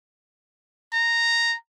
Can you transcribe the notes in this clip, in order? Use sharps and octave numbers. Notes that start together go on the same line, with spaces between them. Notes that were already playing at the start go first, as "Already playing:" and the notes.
A#5